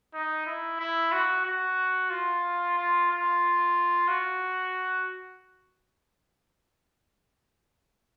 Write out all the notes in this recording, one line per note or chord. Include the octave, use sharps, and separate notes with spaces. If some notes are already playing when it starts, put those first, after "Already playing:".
D#4
E4
E4
F#4
F#4
F4
F4
F4
F#4